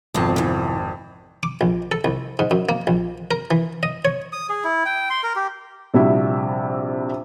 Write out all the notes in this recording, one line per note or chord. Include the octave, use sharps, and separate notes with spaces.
G#1 F2 B2 C4 A5
C3 E3
D6
A#1
A4
C2
G#2
F#2
A#3
A#1
A#4
E3
D#5
C#5
D#6
G#4
E4
G5
C6
A#4
G4
A#1 C3 G3 E4 F#4 E5